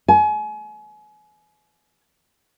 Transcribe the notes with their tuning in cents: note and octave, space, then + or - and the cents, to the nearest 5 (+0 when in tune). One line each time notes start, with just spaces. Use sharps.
G#5 +35